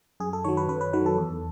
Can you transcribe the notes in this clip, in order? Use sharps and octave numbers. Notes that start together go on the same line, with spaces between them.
F#2 G#4
A4
D#3 F#3 C#5
B4
F#2 B4
B4
D#3 F#3 B4
A4
E2